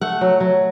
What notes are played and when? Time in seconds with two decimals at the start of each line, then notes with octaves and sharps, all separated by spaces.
0.01 A3 F#5
0.21 F#3
0.40 F#3